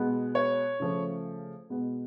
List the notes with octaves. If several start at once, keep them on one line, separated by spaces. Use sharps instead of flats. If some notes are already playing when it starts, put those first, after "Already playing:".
Already playing: B2 G#3 B3
C#5
C#3 F3 A3
B2 G#3 B3